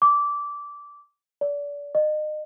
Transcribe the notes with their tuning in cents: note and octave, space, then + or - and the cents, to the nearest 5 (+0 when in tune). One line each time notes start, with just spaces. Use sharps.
D6 -15
D5 -30
D#5 -30